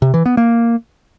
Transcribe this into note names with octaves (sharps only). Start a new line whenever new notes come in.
C3
E3
B3
A#3